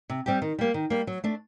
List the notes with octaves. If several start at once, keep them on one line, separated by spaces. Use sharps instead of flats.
C3
G3 C4 G4
D#3
G3 A#3
D#3
G3 A#3
F#3
A3 D4